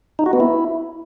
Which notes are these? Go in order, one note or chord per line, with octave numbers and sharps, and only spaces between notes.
D#4
F#4
B3
E4